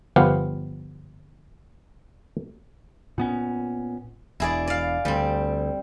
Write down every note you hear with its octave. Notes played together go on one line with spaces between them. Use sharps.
G1 F3 B3 G4 F5 F#5
A#2 B3 C#4
E1 E4 G#4 D5
D5 F5
D2 G3 C4